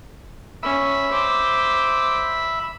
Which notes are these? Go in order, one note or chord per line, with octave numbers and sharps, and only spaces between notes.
C#4 E5 B5
C5 D6